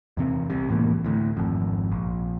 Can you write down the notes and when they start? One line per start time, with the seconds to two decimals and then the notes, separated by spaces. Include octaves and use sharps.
0.17 E2 C3 C4
0.50 C2 C3
0.69 C#2 A2 E3 A#3
1.05 D2 A2
1.37 G#1 F2
1.92 A#1